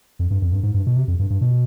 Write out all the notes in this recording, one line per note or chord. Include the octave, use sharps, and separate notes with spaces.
F2
G2
F2
G2
G#2
G2
B2
C3
F2
G2
G2
B2